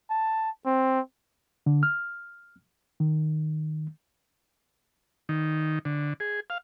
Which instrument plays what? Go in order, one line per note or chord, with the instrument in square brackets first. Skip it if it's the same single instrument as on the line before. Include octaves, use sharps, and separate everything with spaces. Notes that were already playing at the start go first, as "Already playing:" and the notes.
[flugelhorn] A5
C4
[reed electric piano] D3
F6
D#3
[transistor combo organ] D#3
D3
G#4
F5